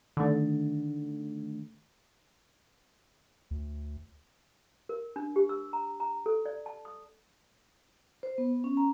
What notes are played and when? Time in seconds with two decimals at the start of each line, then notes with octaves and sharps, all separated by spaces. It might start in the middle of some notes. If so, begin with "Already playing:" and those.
0.17 D3 D#3 A3
3.51 D2
4.89 A#4
5.16 D4
5.36 G4
5.49 E6
5.73 A#5
6.00 A#5
6.26 A4
6.46 D5
6.66 A5
6.85 D#6
8.23 C5
8.38 B3
8.64 C#4
8.77 A#5